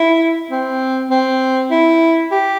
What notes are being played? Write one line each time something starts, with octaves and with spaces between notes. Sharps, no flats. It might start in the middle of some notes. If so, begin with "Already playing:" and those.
Already playing: E4
C4
C4
E4
G4